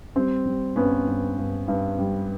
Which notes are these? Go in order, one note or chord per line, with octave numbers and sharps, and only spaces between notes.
G3 C4
G3
G2 B3 C#4
G2
G2
G2
G3